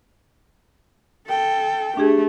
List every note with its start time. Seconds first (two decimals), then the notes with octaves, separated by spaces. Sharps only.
1.28 A4 G5
1.97 A3 D4 G4 G#4